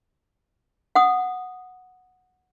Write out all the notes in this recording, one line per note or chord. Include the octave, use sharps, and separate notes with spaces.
F#5 D#6